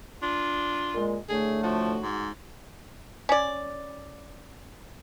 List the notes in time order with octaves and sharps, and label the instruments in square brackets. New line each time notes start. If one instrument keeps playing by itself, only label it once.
[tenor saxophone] D4 [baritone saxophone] F4
[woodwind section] A#2 G#3
[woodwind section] A2 D3 A3 [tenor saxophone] G#4
[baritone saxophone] F3 [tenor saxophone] F#4
[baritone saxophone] G#2
[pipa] C#4 D5